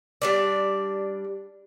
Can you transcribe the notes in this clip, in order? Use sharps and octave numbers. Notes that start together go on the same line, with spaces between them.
G3 D4 D5